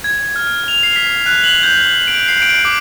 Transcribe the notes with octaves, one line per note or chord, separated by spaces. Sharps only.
G#6
F6
F7
C7
B6
F#6
F#7
G6
D7
C7
D7
D6